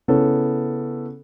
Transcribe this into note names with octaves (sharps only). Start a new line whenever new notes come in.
C#3 B3 C#4 E4 A4